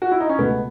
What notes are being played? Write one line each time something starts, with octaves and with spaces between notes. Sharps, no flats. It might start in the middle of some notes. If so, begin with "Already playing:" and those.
F#4
E4
D#4
C#4
C#2 B2 A3 B3